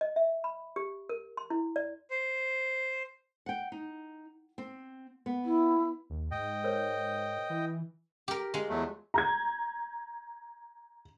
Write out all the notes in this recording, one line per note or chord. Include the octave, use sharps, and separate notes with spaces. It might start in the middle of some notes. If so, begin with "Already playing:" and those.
D#5
E5
B5
G4
A#4
C6
E4
D5
C5
F#5 G5
D#4
C4
B3
E4
D#2
G#2 D#5 G5
A#4 C5 C#5
E3
G4 A#4
G#3 F4
E2 F#3 A3
A#5 G6 G#6